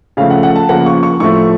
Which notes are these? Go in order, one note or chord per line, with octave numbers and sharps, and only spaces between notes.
C#3 F3 A3 F5
F#5
F#5
A5
C#3 F3 A#3 F#5
C#6
C#6
A2 F3 A3 C#6